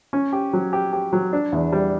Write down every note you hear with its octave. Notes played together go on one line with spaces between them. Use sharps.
C#4
G4
F#3
G4
G4
F#3
D4
E2
G3